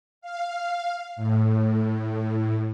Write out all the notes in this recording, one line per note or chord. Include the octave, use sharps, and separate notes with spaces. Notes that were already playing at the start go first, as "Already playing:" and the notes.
F5
A2